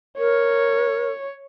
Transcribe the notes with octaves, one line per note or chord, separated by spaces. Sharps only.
A#4 C#5